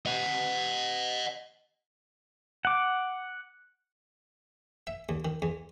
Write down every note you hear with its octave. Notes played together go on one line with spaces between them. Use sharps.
D#5 F#5
F#5 D6
E5
D#2
D#3
E2